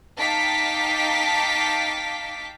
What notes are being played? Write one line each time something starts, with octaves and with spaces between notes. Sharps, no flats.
D#4 F5 G5 A5 D6 B6